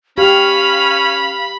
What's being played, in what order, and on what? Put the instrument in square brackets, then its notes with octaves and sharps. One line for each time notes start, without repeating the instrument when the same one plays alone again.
[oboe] C#4 [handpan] G4 [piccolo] F5 [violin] B5